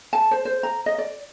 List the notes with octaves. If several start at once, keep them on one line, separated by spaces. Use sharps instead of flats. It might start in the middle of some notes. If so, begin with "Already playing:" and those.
A5
C5
C5
A#5
D#5
D5